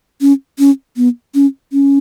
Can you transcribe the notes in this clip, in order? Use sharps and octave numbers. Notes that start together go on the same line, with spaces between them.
C#4
C#4
B3
C#4
C#4